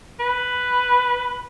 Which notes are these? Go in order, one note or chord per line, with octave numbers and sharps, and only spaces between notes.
B4